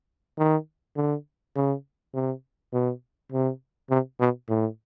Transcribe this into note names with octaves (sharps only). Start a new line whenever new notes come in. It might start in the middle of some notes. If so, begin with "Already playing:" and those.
D#3
D3
C#3
C3
B2
C3
C3
B2
A2